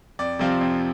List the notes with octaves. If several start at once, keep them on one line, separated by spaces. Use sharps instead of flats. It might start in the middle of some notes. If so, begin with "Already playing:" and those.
F2 D5
C3 F3 C4 F4
F2